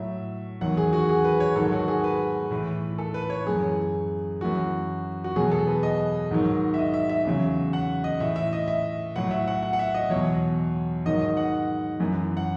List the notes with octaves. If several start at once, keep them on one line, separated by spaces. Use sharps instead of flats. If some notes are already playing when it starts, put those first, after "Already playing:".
Already playing: A2 F#3 E5
E2 D#3 F#3 F#5
G#4
F#4
G#4
B4
C#5
G#2 D#3 F#3 A4
F#4
G#4
B4
A2 E3
A4
B4
C#5
F#2 E3 G#4
F#2 E3 F#4
F#4
E2 B2 F#3 G#4
A4
B4
D#5
G#2 D#3 F#3
E5
D#5
E5
E5
E2 C#3 F#3
F#5
D#5
A2 E3 E5
E5
D#5
E5
A2 F#3 F#5
E5
F#5
F#5
F#5
E5
D#5
E2 B2 F#3 C#5
G#2 D#3 F#3 D#5
D#5
F#5
F#2 E3
F#5